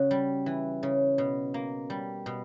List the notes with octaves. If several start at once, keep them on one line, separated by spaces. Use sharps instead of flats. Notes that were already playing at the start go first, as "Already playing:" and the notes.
Already playing: C#3 F#4
G3
E3
C#3
B2
A#3
G3
B2